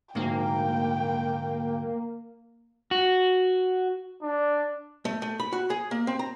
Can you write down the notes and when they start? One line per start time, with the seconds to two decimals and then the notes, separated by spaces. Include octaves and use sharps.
0.15 D2 G#2 A#3 G5
2.91 F#4
4.22 D4
5.05 A3
5.22 A3
5.40 B5
5.52 F#4
5.70 G#4
5.91 A#3
6.07 C4
6.19 A#5